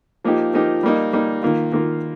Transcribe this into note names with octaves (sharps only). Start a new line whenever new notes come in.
F3 A#3 D#4 G4
F3 A#3 D#4 G4
G3 A#3 D#4
G3 A#3 D#4
D#3 A#3 F4
D#3 A#3 F4